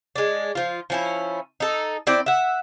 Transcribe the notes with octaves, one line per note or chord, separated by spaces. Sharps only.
G#3 D4
F3 F4
F3 C#4 E4
D#4 A4
C4 E4 D5 G5
E5 F#5